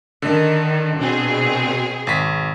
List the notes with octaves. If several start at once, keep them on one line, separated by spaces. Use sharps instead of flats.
D3 D#3
B2 C4 G#4
G#1 B6